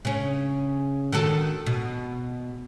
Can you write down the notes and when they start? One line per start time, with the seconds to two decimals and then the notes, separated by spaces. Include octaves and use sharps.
0.05 C#3 C#4
1.12 D#3 F#4 A4
1.66 B2